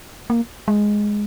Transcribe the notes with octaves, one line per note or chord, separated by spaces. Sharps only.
A#3
G#3